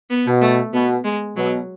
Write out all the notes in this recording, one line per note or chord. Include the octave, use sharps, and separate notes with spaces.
B3
B2
A3
B2 B3
G#3
B2 F#3